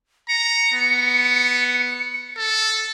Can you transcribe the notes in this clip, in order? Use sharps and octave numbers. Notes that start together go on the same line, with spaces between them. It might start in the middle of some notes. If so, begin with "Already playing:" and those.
A#5 C#7
B3
A4